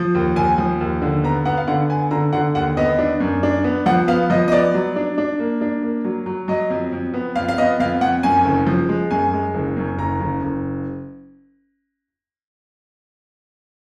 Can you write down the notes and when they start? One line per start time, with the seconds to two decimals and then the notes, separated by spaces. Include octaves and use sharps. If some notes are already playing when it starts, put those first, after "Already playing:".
Already playing: F3
0.15 D#2
0.36 D#2 G#5
0.58 F3
0.81 D#2
1.02 D3
1.24 B3 A#5
1.45 B3 F#5
1.57 F5
1.68 D3 F#5
1.90 B3 G#5
2.11 D3 A#5
2.33 D3 F#5
2.55 D#2 F#5
2.77 B3 D#5
2.99 D4
3.20 F#2
3.43 D4
3.64 B3
3.86 F3 F#5
4.08 B3 F5
4.30 F3 D#5
4.48 D#5
4.52 B3 D5
4.74 F#3
4.96 D4
5.18 D4
5.39 A#3
5.61 D4
5.82 A#3
6.05 F#3
6.26 F#3
6.48 F#3 D#5
6.70 F2
6.92 F2
7.14 B3
7.36 F2 F5
7.48 F5
7.58 B3 D#5
7.80 F2 F5
8.01 F2 F#5
8.23 F#2 G#5
8.45 F#1
8.67 F3
8.89 G#3
9.11 F#2 G#5
9.33 G#3
9.54 F#1
9.77 F#2
9.98 F#1 A#5
10.20 F#1
10.42 F#1